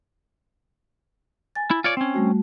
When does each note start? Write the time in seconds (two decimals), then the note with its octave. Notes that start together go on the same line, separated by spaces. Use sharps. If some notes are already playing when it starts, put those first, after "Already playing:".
1.55 G#5 A6
1.71 E4
1.84 F4 C#5 D5
1.97 C4 C#4
2.14 G3 A3 F#4